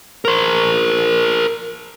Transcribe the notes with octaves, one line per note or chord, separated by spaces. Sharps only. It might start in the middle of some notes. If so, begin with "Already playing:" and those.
A#4 C5